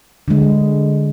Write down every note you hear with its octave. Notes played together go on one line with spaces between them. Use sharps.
D3 G#3